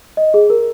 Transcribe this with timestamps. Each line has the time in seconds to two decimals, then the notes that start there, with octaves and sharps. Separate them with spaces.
0.17 D#5
0.34 G#4
0.50 A#4